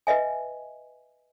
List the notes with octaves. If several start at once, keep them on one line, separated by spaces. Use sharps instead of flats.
B4 D#5 E5 G#5